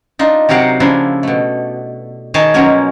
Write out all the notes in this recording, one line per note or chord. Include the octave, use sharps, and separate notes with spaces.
D4 D#4 F4
C3 F#3 G4 A#4 F5 F#5
C#3 F3 A#3 D4 E4
B2 A3
D#3 G#4 C#5 G#5 A5
B2 F3 F#3 A#3 C#4 G#5